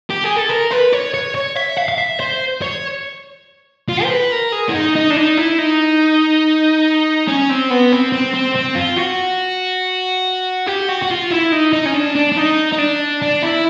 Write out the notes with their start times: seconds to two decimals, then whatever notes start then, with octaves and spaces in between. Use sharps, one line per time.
0.10 G4
0.24 G#4
0.37 A4
0.50 A#4
0.72 B4
0.93 C#5
1.14 C#5
1.35 C#5
1.56 E5
1.77 F5
1.89 F5
1.98 E5
2.20 C5
2.62 C#5
3.89 F4
4.03 C5
4.10 B4
4.32 A#4
4.52 G#4
4.69 E4
4.74 D#4
4.96 D#4
5.10 D4
5.17 D#4
5.38 E4
5.58 D#4
7.28 C#4
7.50 C4
7.71 B3
7.92 C4
8.12 C4
8.34 C4
8.56 C4
8.76 F4
8.97 F#4
10.67 G4
10.89 F#4
11.02 F#4
11.10 F4
11.31 E4
11.52 D#4
11.73 D#4
11.86 C#4
11.94 D4
12.16 D4
12.32 D4
12.37 D#4
12.72 D#4
12.79 D4
13.22 D4
13.42 E4